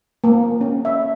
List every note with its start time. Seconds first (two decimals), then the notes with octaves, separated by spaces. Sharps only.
0.24 A#3
0.61 C#4
0.85 E5